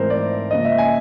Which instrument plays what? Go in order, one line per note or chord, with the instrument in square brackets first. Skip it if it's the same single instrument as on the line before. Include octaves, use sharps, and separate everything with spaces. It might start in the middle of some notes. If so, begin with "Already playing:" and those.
Already playing: [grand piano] G#2 E3 A3 C4 A#4 C5
D5
C#3 F3 A#3 D#5
E5
G#5